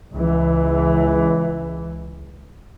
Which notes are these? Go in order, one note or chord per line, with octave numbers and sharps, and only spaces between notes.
C#2 E3